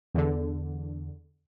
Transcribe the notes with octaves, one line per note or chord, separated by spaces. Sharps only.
E2 D3